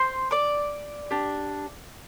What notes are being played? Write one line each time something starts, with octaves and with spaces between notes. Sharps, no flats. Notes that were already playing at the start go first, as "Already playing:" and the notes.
Already playing: C5 C6
D5 D6
D4 G4